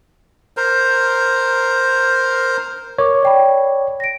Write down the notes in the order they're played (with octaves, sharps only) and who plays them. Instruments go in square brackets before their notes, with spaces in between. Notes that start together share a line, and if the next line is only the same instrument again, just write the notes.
[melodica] A#4 C5
[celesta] A#4 D6 [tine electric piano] C#5
[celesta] D5 G5 B5
A#6 D7